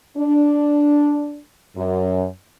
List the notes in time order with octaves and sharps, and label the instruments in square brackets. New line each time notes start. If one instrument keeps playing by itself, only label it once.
[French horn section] D4
F#2